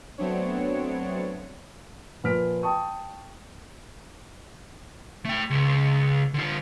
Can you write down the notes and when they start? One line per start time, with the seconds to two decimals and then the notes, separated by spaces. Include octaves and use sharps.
0.18 F#3 A3 B3 C4 D4 C#5
2.24 A#2 F3 B4 F6 B6 D7
2.63 G5 A5 C#6 D#6
5.25 A3 G5
5.50 C#2
6.34 D3 F4